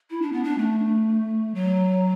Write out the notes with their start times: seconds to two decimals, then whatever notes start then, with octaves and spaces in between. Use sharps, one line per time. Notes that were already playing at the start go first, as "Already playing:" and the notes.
0.10 E4
0.22 D4
0.33 B3
0.44 D4
0.59 A3
1.55 F#3